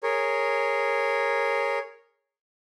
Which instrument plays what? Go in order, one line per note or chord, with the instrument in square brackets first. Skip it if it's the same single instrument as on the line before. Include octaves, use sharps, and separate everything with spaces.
[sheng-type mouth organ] G#4 A#4 C#5